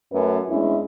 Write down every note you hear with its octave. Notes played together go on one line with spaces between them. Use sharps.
F#2 A3 C#4 B4
E2 G#3 C#4 D4 E4